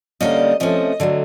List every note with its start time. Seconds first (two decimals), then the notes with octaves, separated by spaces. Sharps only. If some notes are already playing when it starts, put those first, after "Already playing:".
0.21 D3 G3 A#3 C#4 D#5
0.60 C3 F3 A3 C#4 D#5
1.00 D3 F#3 A3